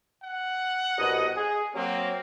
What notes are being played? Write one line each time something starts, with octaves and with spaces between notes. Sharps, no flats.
F#5
C2 B2 D#5
G#4
F#3 A#3 C4